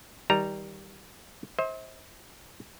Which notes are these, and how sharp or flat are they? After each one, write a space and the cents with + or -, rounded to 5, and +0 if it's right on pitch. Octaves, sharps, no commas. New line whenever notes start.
D#3 +30 G3 +0 A#5 +0
C5 +25 E5 -45